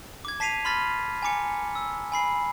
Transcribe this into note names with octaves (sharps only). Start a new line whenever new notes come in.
D6 G#6
A5 B6 C7 D#7 F7
B5 C6 F6 A6 B6
G#5 A#5 D6 C#7
E6
G#5 B5 C7